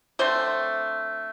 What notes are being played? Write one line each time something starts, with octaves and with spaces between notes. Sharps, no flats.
D3 A3 C4 C5